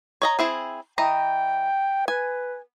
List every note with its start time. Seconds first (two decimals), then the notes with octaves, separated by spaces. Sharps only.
0.22 C#5 D#5 A#5
0.39 C4 E4 G#4
0.98 E3 D#5 G5 A#5
2.08 B4 G#5